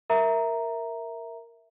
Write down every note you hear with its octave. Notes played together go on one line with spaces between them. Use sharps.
A#4 E5 A#5